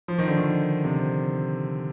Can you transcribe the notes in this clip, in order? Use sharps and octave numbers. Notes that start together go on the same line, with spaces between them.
F3
D#3
D3
D#3
C3